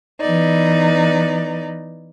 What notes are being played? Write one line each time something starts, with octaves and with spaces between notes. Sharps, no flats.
E3 B3 D#4 D5